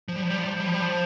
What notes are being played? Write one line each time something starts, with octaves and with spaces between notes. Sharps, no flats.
F3
G3
F3
G3
F3
G3
F3
G3
F3
G3
F3